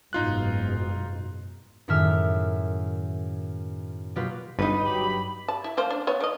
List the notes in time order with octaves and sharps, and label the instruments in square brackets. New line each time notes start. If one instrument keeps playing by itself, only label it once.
[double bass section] F#1 G#2 B2 [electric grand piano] D#4 F4 F#6
[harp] F#2 A2 D#3 G#3 E5 F6
B2 F#3 A#3 F4 G4 B4
[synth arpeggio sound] G1 [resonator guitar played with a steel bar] D#4 B4
[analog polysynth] G2 F#3 G4 [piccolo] B5
[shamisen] A5
E4
F3 A#3 C5
D4
B3 C#5
D#3 D#5